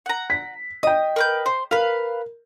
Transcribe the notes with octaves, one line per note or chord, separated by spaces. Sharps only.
F#5 A#5
B6
D#5 G5 D#6
A#4 B4 G6
C5
A#4 B4 F5